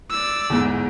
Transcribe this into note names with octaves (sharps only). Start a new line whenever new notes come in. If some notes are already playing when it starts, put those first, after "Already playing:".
D5 E6
G1 E2 G#2